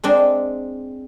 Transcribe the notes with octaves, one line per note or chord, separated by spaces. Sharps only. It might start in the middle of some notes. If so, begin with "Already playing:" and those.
G#3 C4 D4